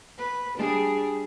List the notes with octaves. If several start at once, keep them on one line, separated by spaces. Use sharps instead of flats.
B4
G3 D4 G#4